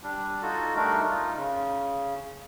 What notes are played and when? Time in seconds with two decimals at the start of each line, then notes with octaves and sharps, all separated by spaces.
0.03 G3 D4
0.42 D#4 F4 F#4 A4
0.76 G3 A3 D4 D#4 A#4
1.09 D#4 F4
1.36 C#3